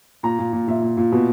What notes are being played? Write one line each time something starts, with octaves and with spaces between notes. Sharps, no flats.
A#2 A#5
A#2
A#2
A#2 E5
A#2
A#2
B2